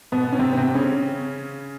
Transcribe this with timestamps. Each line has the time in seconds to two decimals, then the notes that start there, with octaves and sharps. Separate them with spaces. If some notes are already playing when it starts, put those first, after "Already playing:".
0.12 B2 B3
0.33 C#4
0.39 C3 C4
0.52 B3
0.57 C3 C4
0.75 C#3 C#4